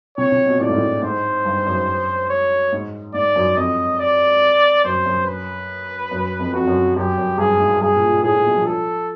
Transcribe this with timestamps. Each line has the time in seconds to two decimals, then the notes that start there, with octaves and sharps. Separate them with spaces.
0.18 C3 C#5
0.32 C3
0.46 B2
0.60 A2 D5
0.69 G#2
0.76 A2
1.02 G#2 C5
1.45 G2
1.67 F#2
2.30 C#5
2.72 G#2
3.14 G#2 D5
3.36 F#2
3.57 F2 D#5
3.99 D5
4.85 F#2 C5
5.06 F#2
5.26 B4
6.11 F#2
6.39 F2
6.54 F2 F#4
6.68 F#2
6.96 F#2 G4
7.18 F#2
7.38 G2 G#4
7.60 G#2
7.81 G2 G#4
7.95 A#2
8.09 A#2
8.23 A2 G#4
8.34 A#2
8.45 B2
8.56 F3
8.66 A4